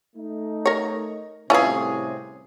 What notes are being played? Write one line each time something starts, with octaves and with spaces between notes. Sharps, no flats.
A3 D#4
A#4 C#5
C2 A2 C3 C#4 E4 F4 G#4 B4